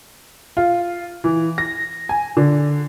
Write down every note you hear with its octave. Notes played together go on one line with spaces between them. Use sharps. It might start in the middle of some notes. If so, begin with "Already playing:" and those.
F4
E3
A#6
G#5
D3